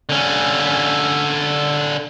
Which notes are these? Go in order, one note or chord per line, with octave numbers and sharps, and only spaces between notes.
D3 C#4